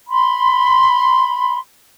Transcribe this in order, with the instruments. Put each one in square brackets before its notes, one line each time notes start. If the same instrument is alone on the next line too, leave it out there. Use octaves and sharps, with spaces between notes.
[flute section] B5 C6